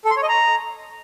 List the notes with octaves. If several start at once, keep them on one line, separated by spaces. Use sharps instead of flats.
A4
C6
C#5
D#5
A#5